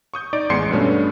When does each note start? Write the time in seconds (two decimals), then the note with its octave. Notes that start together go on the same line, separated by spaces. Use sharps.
0.14 C#6 D#6 G6
0.33 D#4 D5 D6 D7
0.49 A1 E2 G#3 C6 C7 C#7
0.71 G2 B2 A3 B3 C#4 D4